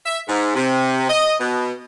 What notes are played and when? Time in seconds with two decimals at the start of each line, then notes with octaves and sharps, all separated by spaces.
0.06 E5
0.28 G#2
0.55 C3
1.10 D#5
1.40 B2